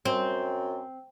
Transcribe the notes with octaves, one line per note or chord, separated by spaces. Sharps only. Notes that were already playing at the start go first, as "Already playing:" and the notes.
F#2 C4